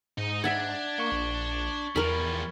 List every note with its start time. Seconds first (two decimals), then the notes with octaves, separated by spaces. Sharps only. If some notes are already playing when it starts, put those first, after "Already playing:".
0.18 G#2 D#4 D#5
0.44 D4 E5 F#5 G#6 A6 B6
0.98 A#3 C#6 C#7 G7
1.12 A#1
1.96 E2 F3 G3 A#4 B5